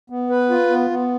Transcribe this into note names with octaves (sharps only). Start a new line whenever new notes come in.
B3
B4
F4
B3
B3